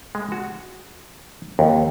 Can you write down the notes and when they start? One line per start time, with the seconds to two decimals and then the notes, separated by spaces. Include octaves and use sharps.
0.15 G#3
0.32 F#4
1.59 D#2